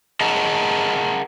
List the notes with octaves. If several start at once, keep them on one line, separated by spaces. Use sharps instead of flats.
G#4 A#4 D#5 F#5 A5 A#5